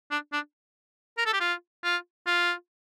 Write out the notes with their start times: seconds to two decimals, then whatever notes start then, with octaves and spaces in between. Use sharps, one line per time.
0.11 D4
0.33 D4
1.18 A#4
1.26 A4
1.33 G4
1.40 F4
1.84 F4
2.26 F4